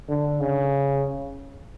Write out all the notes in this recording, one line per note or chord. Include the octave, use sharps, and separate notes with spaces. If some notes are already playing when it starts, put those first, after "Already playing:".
D3
C#3